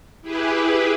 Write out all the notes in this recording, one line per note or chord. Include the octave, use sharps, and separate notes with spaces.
E4 G4 G#4 B4